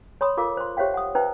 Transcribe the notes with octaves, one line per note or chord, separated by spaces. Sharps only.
C#5 B5 C6 D#6
F4 A4 A#4 F5 D6
C5 C6
G4 C5 C#5 E5 F5 G5
F#5 D#6
D#4 B4 C5 E5 G5 A#5